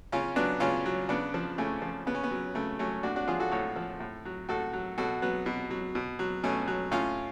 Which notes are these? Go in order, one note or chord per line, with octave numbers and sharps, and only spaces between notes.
C#3 C#4 F4
F#3 B3 D4
C#3 C#4 F4
F#3
C#3 B3 D4
F3
C#3 A3 C#4
F3
C#3 B3
C#4
B3
F#3
C#3 A3
F#3 A3 C#4
A2 D4 F#4
D4 F#4
F3 F4 G#4
F#4 A4
A2 A4 C#5
F3
A2
F#3
A2 F#4 A4
F#3
B2 F#4 A4
F#3 B3
B2
F#3
B2
F#3
B2 A3 C#4
F#3
A2 C#4 F4